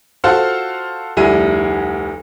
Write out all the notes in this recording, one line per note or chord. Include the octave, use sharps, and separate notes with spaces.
F4 F#4 A4 C5 F5 F#5
F1 D2 G3 E4 G#4 D#7